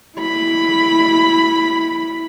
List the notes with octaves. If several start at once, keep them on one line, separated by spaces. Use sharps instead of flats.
E4 B5